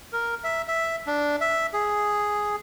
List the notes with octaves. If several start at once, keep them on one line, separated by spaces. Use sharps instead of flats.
A#4
E5
E5
D4
E5
G#4